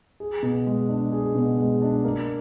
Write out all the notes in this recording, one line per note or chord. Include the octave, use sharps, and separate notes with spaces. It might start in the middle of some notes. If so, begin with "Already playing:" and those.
G#4
B2
G#3
D4
G#4
B2
G#3
D4
A#3